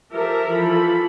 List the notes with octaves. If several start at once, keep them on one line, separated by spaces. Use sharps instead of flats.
F3 G4 A4 A#4 E5
E3 F3 A4 B5